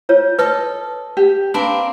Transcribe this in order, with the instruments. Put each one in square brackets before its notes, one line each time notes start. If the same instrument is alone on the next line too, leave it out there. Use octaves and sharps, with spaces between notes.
[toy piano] F4 C#5
[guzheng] A4 D#5 [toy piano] B4
[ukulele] G4
[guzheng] A#3 C4 D4 [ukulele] B4